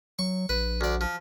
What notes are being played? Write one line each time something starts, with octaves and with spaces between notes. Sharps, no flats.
F#3 C#6
A#1 B4
D2 D5
F3